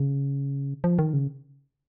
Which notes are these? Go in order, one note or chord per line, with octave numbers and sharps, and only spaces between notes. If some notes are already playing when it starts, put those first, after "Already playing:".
Already playing: C#3
F3
D#3
C#3